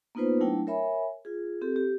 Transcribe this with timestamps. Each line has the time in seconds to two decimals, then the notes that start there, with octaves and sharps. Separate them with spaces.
0.15 A#3 B3 D#4 F4 B4 C5
0.41 F#3 A3 D4 E4 G5
0.67 A#4 C#5 E5 G#5 B5
1.25 F4 G#4
1.61 C4 G4 A4
1.76 G4